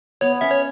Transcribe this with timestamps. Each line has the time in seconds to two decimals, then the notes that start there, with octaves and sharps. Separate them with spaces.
0.21 B3 C#5
0.41 C#4 E5
0.51 C#5